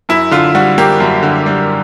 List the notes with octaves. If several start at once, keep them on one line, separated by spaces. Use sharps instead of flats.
F#2 E4
D3 F4
G3 F#4
A#3 G4
F#2
D3
G3